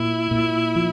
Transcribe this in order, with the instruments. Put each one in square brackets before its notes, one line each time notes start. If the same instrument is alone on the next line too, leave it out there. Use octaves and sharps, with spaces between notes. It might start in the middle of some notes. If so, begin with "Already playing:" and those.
Already playing: [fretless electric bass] A#2 [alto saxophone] E4
[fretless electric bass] A#2
F3